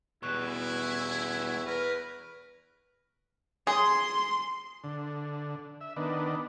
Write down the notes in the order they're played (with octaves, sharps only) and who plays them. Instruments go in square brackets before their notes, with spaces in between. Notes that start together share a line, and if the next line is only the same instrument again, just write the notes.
[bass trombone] E2 [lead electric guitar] B2 G3 [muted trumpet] E4 [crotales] C#6 F#6
[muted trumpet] A#4 [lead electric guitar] B4
[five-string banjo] G#4 [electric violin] C6
[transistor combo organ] D3
E5
D#3 B3 D4